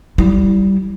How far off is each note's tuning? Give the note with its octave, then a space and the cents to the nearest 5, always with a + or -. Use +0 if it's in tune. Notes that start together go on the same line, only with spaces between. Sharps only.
G3 -20 E4 +0